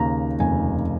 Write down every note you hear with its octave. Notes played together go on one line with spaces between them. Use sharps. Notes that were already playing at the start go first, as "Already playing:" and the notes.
Already playing: D#2 C#3 A#5
F1 G#5